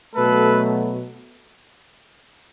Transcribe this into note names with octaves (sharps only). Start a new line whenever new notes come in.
B2 F#3 A3 A4 B4